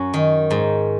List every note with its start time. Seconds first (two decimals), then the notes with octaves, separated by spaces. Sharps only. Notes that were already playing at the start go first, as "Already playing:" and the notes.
Already playing: F#2 F#3 C#4
0.14 D#3
0.51 G#2